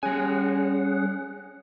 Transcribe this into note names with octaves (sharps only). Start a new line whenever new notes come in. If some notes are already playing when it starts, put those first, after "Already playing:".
G3 C#4 G#4 F#5 G#5